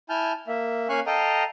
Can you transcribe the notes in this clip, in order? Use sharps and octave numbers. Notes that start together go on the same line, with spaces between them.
E4 G#5 A5 F6 G6
A#3 E5
A#3 C#4 F5 G#5 C#6 F#6
A4 D#5 F5 G5 A#5